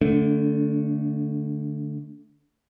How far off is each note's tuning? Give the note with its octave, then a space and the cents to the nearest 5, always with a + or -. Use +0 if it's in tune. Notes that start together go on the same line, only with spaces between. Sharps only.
D3 +0 A3 +0 D4 -40